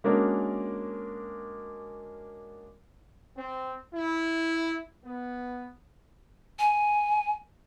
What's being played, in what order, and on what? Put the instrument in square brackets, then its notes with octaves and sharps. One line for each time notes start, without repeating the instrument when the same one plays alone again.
[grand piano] G#3 A#3 C#4 D4 F#4 A#4
[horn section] C4
E4
B3
[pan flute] G#5